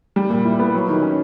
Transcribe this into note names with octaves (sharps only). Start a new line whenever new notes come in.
G3
A#2
E4
B3
F#3
D#3
C#4